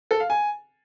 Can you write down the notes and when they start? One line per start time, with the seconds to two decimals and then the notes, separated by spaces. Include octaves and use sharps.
0.11 A4
0.20 F5
0.30 G#5